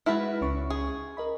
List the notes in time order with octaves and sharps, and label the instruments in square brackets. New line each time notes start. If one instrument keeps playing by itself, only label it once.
[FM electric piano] G#3 F6 [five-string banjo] E4 F#4 B4
[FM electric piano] C#2 C#4 C#6
[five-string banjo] G#4
[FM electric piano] A#4 D#5 B5